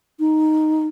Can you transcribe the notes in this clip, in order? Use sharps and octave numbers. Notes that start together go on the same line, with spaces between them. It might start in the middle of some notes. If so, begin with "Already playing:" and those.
D#4